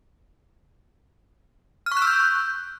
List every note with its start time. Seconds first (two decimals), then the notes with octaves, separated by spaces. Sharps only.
1.86 F6
1.92 C#6
1.97 F#6
2.02 E6
2.07 G6